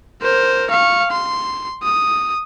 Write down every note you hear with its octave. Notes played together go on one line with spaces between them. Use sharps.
A#4 C5
F5 C#6
C6
D#6